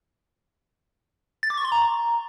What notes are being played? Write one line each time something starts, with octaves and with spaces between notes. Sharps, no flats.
A6
D6
C#6
C6
A#5